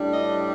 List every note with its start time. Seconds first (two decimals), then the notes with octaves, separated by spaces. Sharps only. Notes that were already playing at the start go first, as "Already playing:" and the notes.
Already playing: A2 G3 D4
0.13 D#5